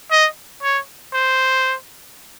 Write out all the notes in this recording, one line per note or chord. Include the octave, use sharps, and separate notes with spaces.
D#5
C#5
C5